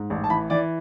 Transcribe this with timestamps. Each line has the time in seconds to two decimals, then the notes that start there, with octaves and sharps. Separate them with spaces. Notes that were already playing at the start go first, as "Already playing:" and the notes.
Already playing: G#2
0.10 A1
0.24 A5
0.30 E3 B5
0.50 E3 D5